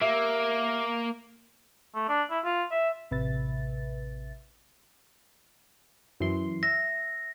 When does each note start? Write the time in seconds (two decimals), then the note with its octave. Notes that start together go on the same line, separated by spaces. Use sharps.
0.01 A#3 G4 E5
1.95 A3
2.09 D4
2.31 E4
2.45 F4
2.71 E5
3.11 A1 C3 B4 E5 A6
6.20 F#2 E3 C6
6.63 E5 A#6